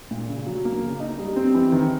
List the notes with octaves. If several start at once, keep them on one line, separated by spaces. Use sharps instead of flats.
A#2
C#3
F#3
A#3
C#3
D#4
G3
C4
E3
D#3